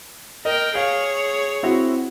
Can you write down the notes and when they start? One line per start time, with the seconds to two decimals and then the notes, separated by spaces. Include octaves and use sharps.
0.45 A#4 D#5 G5
0.75 G#4 C#5 F5
1.63 C4 E4 F#4